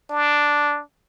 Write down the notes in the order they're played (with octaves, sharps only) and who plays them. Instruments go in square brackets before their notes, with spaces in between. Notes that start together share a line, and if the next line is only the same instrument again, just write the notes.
[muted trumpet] D4